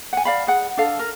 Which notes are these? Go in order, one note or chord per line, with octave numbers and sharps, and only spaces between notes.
F#5 G#5
D5 F5 B5
G#4 F#5
D4 A4 F5
A#4